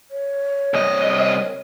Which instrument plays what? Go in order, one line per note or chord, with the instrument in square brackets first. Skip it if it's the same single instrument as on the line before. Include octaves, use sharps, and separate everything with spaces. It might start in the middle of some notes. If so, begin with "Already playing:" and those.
[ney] C#5
[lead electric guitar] C2 D#5